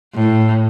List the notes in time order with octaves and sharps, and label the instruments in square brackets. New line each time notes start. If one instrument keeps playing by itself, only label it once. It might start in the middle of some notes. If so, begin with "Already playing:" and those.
[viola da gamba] A2